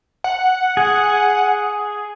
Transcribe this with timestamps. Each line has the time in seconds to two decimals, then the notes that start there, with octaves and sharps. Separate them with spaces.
0.24 F#5
0.77 G#4